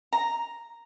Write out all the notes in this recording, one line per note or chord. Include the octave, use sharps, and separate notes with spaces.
A#5